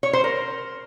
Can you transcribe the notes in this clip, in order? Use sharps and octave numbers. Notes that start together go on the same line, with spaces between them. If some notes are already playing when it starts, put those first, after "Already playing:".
C#5
C5
A#4